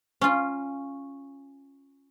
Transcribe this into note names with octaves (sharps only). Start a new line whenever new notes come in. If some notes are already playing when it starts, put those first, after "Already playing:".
C#4 F4